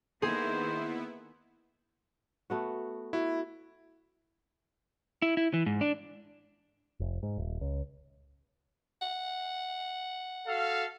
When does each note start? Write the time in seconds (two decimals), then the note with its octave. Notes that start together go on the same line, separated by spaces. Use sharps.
0.22 D#3 A#3 B3 E4 G#4 C5
2.50 A3 B3 F#4
3.13 E4 F#4
5.22 E4
5.37 E4
5.54 E3
5.66 G#2
5.81 D4
7.00 F1
7.23 G#2
7.38 D#1
7.61 C#2
9.02 F#5
10.47 F#4 A4 F5